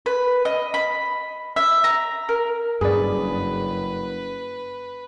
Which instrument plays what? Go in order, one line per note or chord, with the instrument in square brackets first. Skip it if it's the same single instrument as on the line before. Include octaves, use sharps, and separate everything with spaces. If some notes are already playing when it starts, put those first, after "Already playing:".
[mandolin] B4
D#5
B5
E5
A#5
A#4
[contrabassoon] F#1 [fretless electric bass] G2 [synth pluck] G#4 D5 [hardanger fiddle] B4